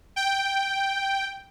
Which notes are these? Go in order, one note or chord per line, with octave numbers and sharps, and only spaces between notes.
G5